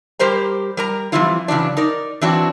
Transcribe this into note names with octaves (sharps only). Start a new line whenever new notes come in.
G3 G4 A#4 C5 A#5
G3 A#4 A#5
E3 F3 G3 C4 E4 F4
C#3 E3 F#3 D4
D#4 A#4 D5
E3 F#3 C4 D4 F#4